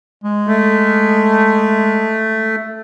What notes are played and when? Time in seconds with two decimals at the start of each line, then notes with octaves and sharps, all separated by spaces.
0.24 G#3
0.47 A3